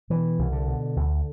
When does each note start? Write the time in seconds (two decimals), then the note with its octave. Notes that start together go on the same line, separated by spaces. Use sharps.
0.10 B2 E3
0.39 C2
0.52 D3
0.68 B2
0.96 D2